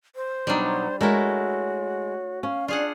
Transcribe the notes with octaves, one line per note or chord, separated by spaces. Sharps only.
C5
B2 F#3 G3 D4 D#4
G#3 A3 E4 F#4 A#4 C#5
C#4 F5
D4 F4 G#4 D5 F#5